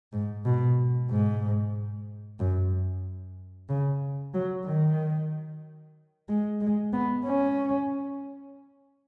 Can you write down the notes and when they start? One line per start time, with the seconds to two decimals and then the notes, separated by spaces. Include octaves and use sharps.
0.13 G#2
0.45 B2
1.10 G#2
2.39 F#2
3.69 C#3
4.34 F#3
4.66 D#3
6.28 G#3
6.61 G#3
6.93 B3
7.26 C#4